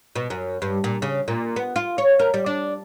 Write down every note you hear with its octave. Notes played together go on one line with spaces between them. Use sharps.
B2
F#2
G2
A#2
C#3
A#2
B3
F4
C#5
A#4
G3
D4